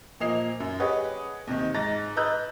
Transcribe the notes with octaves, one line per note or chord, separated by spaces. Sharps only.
A#2 F3 A#3 D#5 C7 F7
F#2
G4 G#4 B4 C#5 D#5 F#5
D#2 C3 D#3
G#2 A#5 A6 A#6
B4 D#5 A#5 E6 F#6 G6